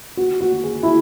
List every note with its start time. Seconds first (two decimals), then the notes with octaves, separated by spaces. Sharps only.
0.17 F#4
0.41 F#4
0.64 G#4
0.83 E4